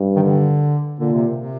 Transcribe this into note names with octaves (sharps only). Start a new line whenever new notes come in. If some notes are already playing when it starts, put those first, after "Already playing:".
Already playing: G2
D#3
D3
A#2 D3
C3
C3